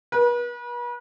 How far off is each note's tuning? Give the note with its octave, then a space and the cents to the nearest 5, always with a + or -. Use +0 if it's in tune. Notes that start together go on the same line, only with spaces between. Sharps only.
B4 -40